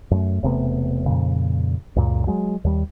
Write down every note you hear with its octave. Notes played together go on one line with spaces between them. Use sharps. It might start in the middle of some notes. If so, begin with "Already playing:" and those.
F#2 A3
E1 C3 A3 B3
F2 A#2 C#3
C#2 F#2 A#2
F#3 G#3
D#2 G3